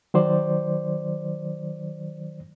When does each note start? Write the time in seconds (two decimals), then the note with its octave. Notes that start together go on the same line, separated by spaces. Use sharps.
0.14 D#3 F#3 C5 D5